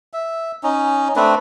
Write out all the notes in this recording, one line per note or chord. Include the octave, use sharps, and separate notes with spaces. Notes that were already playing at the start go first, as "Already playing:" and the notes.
E5
C#4 D#4
A3 C4 D4 B4